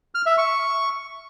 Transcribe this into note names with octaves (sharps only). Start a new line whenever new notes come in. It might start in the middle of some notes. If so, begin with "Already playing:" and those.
F6
E5
C#6